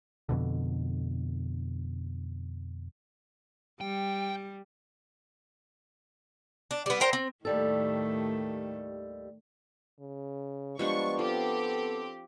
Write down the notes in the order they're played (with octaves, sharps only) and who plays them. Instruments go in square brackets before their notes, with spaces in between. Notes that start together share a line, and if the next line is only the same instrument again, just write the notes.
[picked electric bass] F2 B2 D3
[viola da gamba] G3 [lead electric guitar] G5
[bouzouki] D4
G3 B3
A#4 C5 G5
C4
[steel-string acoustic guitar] D#2 G3 A4 [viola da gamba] A2 D#3 A3
[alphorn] C#3
[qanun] F3 G3 D4 [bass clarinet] G#3 [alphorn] B3 [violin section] C#6
[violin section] C4 G4 [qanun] F4 [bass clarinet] A4